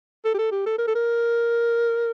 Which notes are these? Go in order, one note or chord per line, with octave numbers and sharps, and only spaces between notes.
A4
G4
A4
G4
A4
A#4
A4
A#4